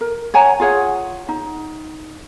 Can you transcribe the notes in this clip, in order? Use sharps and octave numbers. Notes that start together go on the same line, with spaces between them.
A#4
C#5 F#5 G#5 A#5
F4 G#4 C#5 F#5
D#4